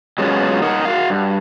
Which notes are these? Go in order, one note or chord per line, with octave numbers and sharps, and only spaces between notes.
F#3 G#3 B3 C#4 F4
D#4 A#4 F#5
F#4 F5
G2